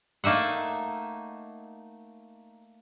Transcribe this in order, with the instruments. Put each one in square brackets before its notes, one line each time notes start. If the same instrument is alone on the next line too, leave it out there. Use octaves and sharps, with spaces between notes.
[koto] A3 A#3 D#4 E5 F#5